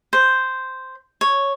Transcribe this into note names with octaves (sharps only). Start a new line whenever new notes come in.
C5
C#5